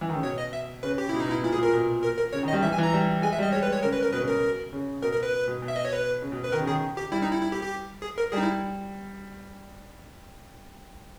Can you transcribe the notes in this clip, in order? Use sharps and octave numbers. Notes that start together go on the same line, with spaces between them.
E3
D#3
C#3
B2 C#5
D#5
E5
C#3 B4
G4
B2 E4
D#4
B2
E4
A#2 E4
G#4
A#2
A#4
B2
A#4
A#4
C#3 C#5
D#3
D#5
G3
E3 E5
G#5
E3
A#5
G3
G#3 G#5
E5
G3
D#5
G#3 C#5
B4
G#3
C#5
C#3 A#4
B4
A#4
B2 B4
C#3
B2 A#4
C#3
B2 A#4
A#4
B4
B2
B2
E5
D#5
C#5
B4
C#3
B2
B4
D#3 A#4
C#3
D#3 G#4
G4
G3 E4
D#4
E4
E4
G4
G4
G#4
A#4
G3 G#4
D#4
E4